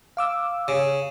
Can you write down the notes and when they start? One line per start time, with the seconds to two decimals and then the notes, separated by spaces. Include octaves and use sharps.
0.17 F5 D6 E6
0.68 C#3